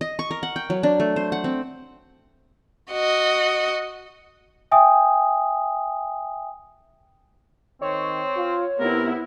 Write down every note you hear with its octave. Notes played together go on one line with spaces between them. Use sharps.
D#5
C#6
A#4
F#5
G5
F#3
D4
A3
C5
F#5
C4
F#4 D#5
E5 G5 G#5 D#6
D#3 C4 C#5
F4
C3 B3 E4 A#4